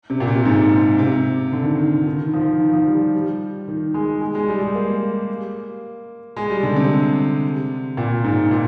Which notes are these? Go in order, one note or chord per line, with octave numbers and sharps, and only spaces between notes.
C3
A#2
C3
G#2
C3
D3
D#3
D3
D#3
D#3
F3
D#3
F3
G3
G3
D#3
G#3
G#3
G#3
G3
G#3
A#3
G#3
G3
D3
C3
A#2
G#2
A#2